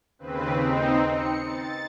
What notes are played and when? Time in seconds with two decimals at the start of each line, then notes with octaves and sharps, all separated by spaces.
0.19 D#2 C#3 C4 B4
0.50 C4 D#4
1.11 C#7
1.44 A6